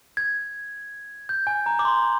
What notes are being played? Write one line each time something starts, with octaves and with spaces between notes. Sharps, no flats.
G#6
G6
G#5
A#5
D6
C6